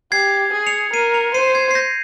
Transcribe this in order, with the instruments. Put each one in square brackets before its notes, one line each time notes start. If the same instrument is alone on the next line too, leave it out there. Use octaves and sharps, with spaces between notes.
[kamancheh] G4 [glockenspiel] G#6 C7
[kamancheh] G#4
[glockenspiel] C#7 F7
[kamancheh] A#4 [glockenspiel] C7 D#7
[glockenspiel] C#7 F7
[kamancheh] C5 [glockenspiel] C7 D#7
[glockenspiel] G#6 C7
C7
G6 A#6